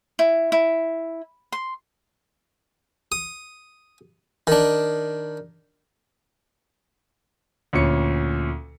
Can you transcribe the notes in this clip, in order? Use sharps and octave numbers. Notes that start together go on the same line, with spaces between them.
E4
E4
C6
D#6
D#3 D4
D2 A#2 C#4 C#7